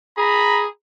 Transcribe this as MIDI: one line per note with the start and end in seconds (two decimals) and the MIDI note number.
0.18 0.67 68
0.18 0.64 82
0.18 0.67 83